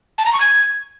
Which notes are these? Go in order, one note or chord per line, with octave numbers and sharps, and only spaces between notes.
A5
A#5
C#6
G#6